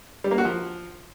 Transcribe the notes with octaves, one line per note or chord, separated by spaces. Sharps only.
G3
A#3
F#4
F3